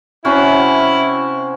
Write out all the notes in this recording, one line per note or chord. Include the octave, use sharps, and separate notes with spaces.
C3 C#4 E4 F#4